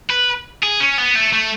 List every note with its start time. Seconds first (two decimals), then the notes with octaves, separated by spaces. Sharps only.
0.10 B4
0.63 G#4
0.80 C#4
0.98 B3
1.15 A3
1.33 A3